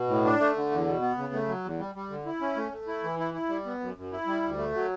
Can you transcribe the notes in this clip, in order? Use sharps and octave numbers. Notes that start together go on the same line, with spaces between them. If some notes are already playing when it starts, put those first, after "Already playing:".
Already playing: B2
A2
D4
A3
D3
E2
B2
B3
C#3
A3
F#3
E2
G3
G3
D3
E4
C#4
A3
A3
E4
E3
E4
E4
G3
B3
F#2
F#2
E4
G3
D2
A3
F#3